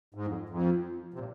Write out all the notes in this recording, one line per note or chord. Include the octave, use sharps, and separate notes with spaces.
G#2
F2
F2
C3
A#2